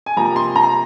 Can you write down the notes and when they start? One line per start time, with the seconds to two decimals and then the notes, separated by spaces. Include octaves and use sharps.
0.06 G#5
0.17 C3 F3 A#3 A#5
0.36 C6
0.56 A#5